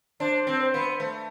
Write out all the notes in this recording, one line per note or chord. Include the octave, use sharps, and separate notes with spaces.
D4 C5
C4
C5
B3
A3